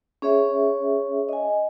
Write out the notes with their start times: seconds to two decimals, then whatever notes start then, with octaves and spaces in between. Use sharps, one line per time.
0.22 C#4 G#4 C#5 E5
1.29 D#5 G#5